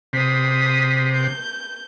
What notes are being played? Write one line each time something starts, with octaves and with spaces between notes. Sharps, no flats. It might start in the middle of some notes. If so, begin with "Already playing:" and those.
C3 D#6 B6
G6